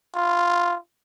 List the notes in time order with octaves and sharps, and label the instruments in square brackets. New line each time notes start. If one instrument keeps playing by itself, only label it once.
[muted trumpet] F4